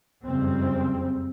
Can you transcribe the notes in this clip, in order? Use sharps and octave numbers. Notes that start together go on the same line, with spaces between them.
F#1 F2 C#3 G3 C4